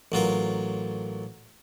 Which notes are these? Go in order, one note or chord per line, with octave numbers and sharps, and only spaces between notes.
A1 F#3 F4 A#4